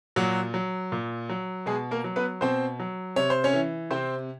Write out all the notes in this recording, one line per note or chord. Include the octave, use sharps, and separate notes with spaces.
A#2 F#3 F#4
F#3
A#2
F#3
B2 G#3 G#4
A#3 A#4
F#3
B3 B4
B2 C4 C5
F#3
C3 C#5
C5
C#4 C#5
E3
C3 C4 C5